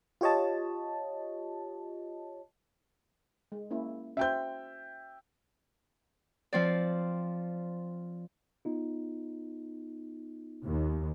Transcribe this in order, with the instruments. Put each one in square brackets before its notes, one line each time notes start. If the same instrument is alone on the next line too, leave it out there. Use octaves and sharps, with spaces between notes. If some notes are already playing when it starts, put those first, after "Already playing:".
[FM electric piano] F4 G4 C#5 D#5 A5
[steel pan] G#3
A#3 C#4 E4
[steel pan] C#4 F#4 C5 [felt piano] E5 G5 G6
[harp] F3 C4 D5
[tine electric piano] B3 D#4 F4
[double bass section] D#2